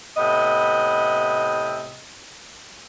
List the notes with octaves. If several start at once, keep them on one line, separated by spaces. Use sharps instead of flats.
A2 C3 B3 D#5